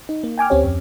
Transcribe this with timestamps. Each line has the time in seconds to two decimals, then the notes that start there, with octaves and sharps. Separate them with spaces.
0.09 D#4
0.24 A#3
0.38 G5 G#5 D6 F6
0.50 D2 C4 C#4 G4 C#5
0.64 F2